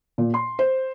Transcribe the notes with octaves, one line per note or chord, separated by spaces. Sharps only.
A#2
C6
C5